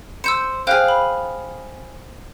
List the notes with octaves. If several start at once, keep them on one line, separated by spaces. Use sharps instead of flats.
C5 E6 G6 C#7
G#4 C5 F5 G5 F#6
B5